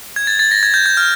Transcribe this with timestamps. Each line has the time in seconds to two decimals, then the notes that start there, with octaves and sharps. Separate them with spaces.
0.16 G#6
0.27 A6
0.39 A6
0.51 A#6
0.63 G#6
0.74 G6
0.86 G6
0.97 F6